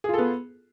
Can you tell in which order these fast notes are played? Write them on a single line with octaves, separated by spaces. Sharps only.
G#4 F4 A4 B3